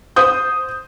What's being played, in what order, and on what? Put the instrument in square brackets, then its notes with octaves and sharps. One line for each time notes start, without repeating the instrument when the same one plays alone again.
[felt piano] C5 D#6 G6